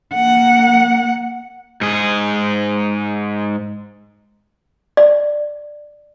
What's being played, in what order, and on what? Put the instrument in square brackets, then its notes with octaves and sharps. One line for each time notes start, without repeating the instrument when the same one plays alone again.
[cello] A#3 F#5
[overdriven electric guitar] G#2 G#4
[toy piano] D5